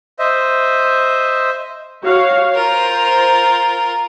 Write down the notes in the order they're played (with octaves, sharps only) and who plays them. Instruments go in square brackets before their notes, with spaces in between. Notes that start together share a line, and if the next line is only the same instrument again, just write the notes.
[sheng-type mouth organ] C5 D#5 E5
[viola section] F#4 C#5 F5
[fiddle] F4 A#4 [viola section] C5